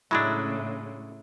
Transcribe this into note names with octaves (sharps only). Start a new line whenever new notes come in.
A2 C#3 F#3 G#3 D4 E4